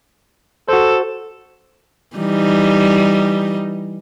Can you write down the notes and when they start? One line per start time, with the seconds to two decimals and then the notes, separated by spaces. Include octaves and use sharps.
0.69 F#4 A4 C5
2.16 E3 G3 D#4